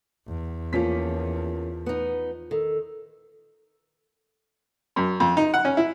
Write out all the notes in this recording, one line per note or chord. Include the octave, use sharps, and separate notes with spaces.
E2
F3 A#3 C#4 B6
B3 D#4
D#3 A4
F#2
F2
D#4
F#5
C#4
E4